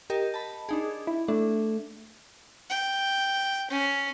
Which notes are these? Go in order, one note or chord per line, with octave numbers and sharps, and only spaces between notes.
G4 A#4 D#5
A5 B5
D4 D#4 G#4
E4
A3 D4
G5
C#4